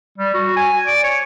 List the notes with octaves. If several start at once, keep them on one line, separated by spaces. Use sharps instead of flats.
G3
F#4
G#5
D5
C#5